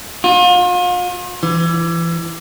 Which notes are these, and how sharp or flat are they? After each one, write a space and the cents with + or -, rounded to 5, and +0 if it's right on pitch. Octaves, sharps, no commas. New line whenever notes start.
F4 +40
E3 +25